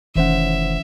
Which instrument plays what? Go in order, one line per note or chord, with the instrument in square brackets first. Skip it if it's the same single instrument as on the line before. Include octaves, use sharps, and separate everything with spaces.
[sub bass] F1 [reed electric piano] D#3 C5 F#5 [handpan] E3 C#4 [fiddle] E5